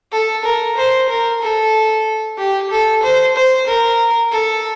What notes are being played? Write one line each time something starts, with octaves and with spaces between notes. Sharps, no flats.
A4
A#4
C5
A#4
A4
G4
A4
C5
C5
A#4
A4